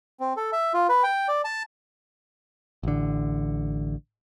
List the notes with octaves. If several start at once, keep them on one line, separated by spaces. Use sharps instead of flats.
C4
A4
E5
F4
B4
G5
D5
A5
A1 D3